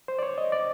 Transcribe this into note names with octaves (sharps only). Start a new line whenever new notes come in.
C5
D5
C#5
D#5
D5